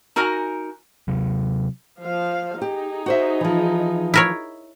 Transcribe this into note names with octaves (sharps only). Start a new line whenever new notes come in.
D#4 F#4 A#4 G#5 A#5
C3 F#3
F3 F5
D#4 G4 G#4
F#4 C5 E5
E3 F3
E4 A#4 C#5